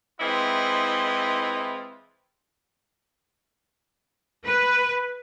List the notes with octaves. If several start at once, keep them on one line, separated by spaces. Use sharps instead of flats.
E3 G#3 C4 E4 F4 D#5
B4